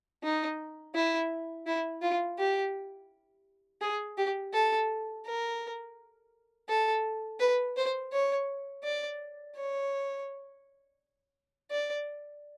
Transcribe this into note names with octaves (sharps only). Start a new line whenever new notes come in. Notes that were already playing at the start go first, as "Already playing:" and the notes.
D#4
E4
E4
F4
G4
G#4
G4
A4
A#4
A4
B4
C5
C#5
D5
C#5
D5